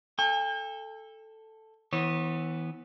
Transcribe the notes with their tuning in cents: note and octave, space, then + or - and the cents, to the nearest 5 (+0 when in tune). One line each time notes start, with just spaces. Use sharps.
A4 +0 G5 +45
E3 -25 B3 +0 C#5 -40